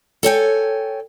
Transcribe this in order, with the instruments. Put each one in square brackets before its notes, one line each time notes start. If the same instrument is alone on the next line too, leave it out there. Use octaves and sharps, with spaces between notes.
[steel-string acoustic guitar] A4 C#5 G5 G#5